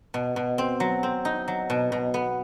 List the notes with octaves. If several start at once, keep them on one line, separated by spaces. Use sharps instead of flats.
B2
B2
C4
F#3
C4
D#4
F#3
B2
B2
B3